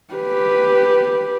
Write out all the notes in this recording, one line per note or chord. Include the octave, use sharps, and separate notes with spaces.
G4 B4